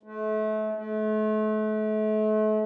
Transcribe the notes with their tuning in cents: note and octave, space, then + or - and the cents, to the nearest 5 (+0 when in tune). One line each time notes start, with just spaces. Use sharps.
A3 -35
A3 -40